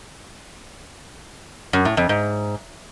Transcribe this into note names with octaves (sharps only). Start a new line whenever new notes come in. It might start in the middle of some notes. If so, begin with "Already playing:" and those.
F#2
A2
F2
G#2